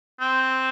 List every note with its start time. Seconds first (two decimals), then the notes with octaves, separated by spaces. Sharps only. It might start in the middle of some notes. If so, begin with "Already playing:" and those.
0.20 C4